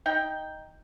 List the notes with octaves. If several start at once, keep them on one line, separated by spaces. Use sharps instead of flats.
D#4 G5